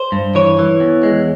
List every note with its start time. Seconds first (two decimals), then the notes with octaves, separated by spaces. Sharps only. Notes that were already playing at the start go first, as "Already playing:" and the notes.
Already playing: C5
0.12 G2
0.35 E3 C#5
0.59 E3
0.80 E2
1.03 G#3